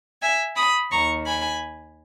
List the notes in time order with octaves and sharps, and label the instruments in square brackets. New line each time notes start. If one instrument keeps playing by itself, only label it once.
[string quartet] E5 G#5
B5 D#6
D#2 D#3 A#5 C#6
G#5 B5